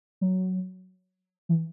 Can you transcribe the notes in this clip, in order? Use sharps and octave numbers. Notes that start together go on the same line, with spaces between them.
F#3
E3